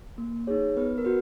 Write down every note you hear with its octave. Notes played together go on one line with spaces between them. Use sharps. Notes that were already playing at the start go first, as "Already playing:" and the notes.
A#3
D#4 G#4 C#5
B3 B4
A#4
F#4 B4